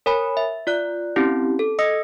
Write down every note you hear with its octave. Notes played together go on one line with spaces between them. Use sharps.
A#4 C#5 G#5 B5
E5
F4 D5 F#6
C4 C#4 E4 G4
A4
D#5 D#6 E6 A#6 C#7